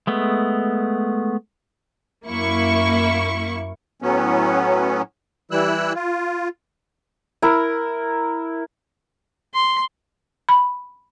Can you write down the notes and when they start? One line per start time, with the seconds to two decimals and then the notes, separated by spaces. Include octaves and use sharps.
0.07 G#3 A3 B3
2.27 F#2 A#3 E4 C#6
4.02 A2 F#3 B3 C#4
5.51 E3 G3 E4 E6 F#6
5.95 F4
7.42 E4 A#4
9.54 C6
10.49 B5